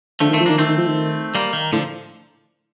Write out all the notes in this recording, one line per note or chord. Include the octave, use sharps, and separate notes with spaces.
D3 F3 A3
D#3
A3 C4
F3
D#3 A#3 D4
D#3 A3 C4
D#3
F3
D#3
G3 A#3
D#3
A2 D3 F3